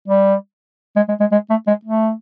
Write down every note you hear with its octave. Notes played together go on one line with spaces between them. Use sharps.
G3
G#3
G#3
G#3
G#3
A3
G#3
A3